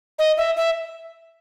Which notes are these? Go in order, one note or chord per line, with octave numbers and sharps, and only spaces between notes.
D#5
E5
E5